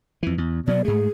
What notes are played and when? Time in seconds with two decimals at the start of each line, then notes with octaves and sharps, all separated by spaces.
0.23 F2 E3
0.38 E2
0.67 B2 F#3 B3 D5
0.85 G#2 A3 G#4